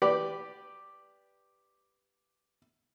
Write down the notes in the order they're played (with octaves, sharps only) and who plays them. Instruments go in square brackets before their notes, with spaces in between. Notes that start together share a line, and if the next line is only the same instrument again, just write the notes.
[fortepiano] G4 B4 D5